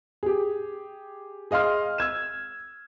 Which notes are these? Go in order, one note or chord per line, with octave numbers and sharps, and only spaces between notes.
G4 G#4
G#4 D#5 F5 C6 F6
E6 G#6 E7